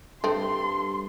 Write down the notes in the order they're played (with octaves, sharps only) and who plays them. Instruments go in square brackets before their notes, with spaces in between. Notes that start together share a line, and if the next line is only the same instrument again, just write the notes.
[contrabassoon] G2 [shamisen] A3 C4 [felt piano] A4 [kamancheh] C6